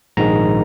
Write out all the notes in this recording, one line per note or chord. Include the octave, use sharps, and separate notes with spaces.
A#1 G#2 D#3 G#3 A#5